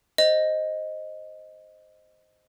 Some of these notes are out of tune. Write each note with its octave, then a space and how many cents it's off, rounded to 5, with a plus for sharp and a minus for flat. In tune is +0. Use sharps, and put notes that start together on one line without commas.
C5 +0 D#5 +0